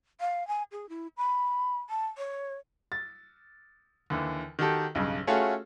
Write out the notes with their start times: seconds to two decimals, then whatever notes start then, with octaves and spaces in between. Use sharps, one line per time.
0.20 F5
0.48 G#5
0.72 G#4
0.89 E4
1.17 B5
1.90 A5
2.18 C#5
2.92 A6
4.10 D#2 D3 E3
4.59 D#3 F#4 G4 A4
4.95 B1 G2 C#3
5.27 A3 C#4 F4 F#4 G#4 A4